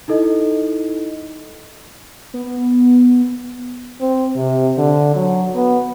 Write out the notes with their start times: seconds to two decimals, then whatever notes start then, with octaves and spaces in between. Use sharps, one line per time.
0.08 D#4 E4 A4 D#5
2.34 B3
4.01 C4
4.36 C3
4.78 D3
5.16 F#3
5.55 B3